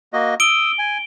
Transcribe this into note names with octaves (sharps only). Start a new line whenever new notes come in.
A#3 F#4 D#5
D#6 E6 D7 G7
G#5